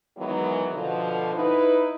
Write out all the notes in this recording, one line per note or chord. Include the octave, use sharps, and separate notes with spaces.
D#3 E3 F#3 G#3 B3
B2 D3 F3
D#4 E4 B4